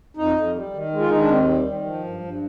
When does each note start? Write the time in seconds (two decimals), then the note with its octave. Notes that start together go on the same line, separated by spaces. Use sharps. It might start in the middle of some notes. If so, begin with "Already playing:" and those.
0.17 F2 D#4
0.36 F2
0.55 G3
0.74 D#3
0.92 G#3
1.00 F4
1.09 D#3 D#4
1.20 D4
1.29 D#2 C4
1.49 G3
1.68 D#3
1.86 F3
2.04 G2
2.23 G2